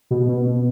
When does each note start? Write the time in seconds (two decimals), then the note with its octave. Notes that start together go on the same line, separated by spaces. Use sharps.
0.11 B2
0.29 B2
0.47 B2